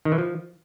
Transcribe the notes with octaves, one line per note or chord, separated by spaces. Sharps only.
D#3
E3
F3